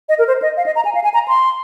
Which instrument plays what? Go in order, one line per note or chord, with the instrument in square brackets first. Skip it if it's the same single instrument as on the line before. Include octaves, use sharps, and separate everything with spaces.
[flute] D#5
A#4
C5
D#5
F5
D#5
A#5
G#5
F5
G#5
A#5
C6